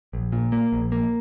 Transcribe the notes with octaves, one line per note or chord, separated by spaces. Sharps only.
A#1
A#2
A#3
A#1
A#3